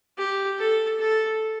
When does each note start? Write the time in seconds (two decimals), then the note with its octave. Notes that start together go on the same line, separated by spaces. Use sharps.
0.18 G4
0.59 A4
0.99 A4